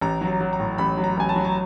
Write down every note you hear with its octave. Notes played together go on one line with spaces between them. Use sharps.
A1 A#5
F#3
A#5
F#3
A#5
A2
A1 B5
F#3
A#5
A1 G#5
A5
F#3
A#5